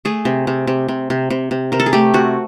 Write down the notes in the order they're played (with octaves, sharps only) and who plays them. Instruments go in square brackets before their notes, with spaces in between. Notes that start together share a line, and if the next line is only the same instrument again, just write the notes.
[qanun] A3 G#4
C3
C3
C3
C3
C3
C3
C3
C3 A#4
A4
G#4
A3 G4
C3 F#4